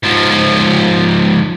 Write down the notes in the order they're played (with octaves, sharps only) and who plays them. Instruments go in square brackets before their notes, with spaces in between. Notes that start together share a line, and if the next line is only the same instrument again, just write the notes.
[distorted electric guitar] G#2 F3